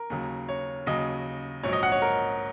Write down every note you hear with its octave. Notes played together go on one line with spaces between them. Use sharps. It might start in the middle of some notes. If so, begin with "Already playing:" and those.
Already playing: A#4
D#2 C#3 F#3
C#5
D#2 C#3 F#3 D#5
A#1 G#2 F#3 C#5
D#5
F#5
C#5
A#4